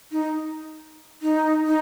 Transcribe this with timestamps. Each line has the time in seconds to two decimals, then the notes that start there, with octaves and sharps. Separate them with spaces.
0.12 D#4
1.22 D#4
1.66 D#4